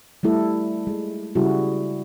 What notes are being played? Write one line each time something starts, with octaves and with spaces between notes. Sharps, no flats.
G3 A3 E4 A4
G#3
C#3 G3 E4 F#4 G#4